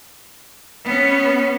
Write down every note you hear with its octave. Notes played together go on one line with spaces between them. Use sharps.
B3 C#4